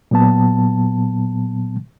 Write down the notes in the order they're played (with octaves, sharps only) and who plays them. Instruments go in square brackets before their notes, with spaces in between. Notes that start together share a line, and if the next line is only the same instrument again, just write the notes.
[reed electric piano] A#2 F#3 B3 A5